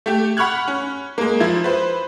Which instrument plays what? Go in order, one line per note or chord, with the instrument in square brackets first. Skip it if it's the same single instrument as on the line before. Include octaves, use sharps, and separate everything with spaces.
[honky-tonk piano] A3 G4
F#5 B5 C#6 F6 F#6 G#6
C#4
G#3 A#3
F3 E4 G#6
B4 C5